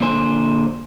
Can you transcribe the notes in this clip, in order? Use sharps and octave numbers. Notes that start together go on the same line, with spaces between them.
A#2 D3 C5 G#5